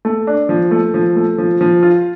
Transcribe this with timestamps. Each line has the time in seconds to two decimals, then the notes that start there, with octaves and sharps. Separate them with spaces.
0.05 A3
0.27 D4
0.49 F3
0.71 A3
0.94 F3
1.16 A3
1.38 F3
1.61 F3
1.83 F4